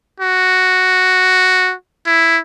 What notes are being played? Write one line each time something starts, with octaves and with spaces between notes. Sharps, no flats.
F#4
E4